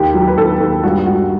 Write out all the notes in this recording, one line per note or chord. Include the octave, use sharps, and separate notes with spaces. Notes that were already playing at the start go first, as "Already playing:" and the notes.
Already playing: D#2 G4
F#3
B4
D#2 A4
D#2
G2 F#4
G2 F#4